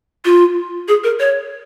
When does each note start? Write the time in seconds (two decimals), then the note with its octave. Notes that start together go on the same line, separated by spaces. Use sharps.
0.25 F4
0.88 G#4
1.04 A#4
1.20 C#5